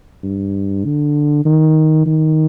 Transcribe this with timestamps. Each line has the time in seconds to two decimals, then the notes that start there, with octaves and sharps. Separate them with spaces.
0.23 G2
0.84 D3
1.45 D#3
2.06 D#3